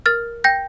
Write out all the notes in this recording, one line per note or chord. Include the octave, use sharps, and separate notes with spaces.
A#4 F6 A6
G5 G6 A#6